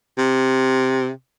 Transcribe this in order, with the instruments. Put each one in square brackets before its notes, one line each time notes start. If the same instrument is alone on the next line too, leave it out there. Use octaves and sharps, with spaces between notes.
[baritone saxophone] C3